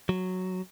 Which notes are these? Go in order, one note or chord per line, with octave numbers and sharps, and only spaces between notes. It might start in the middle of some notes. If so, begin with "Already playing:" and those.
F#3